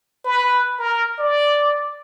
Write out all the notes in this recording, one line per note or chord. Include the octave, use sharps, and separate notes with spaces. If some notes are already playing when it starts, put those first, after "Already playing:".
B4
A#4
D5